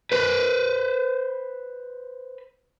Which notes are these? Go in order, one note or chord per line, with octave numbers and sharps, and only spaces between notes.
B4 C5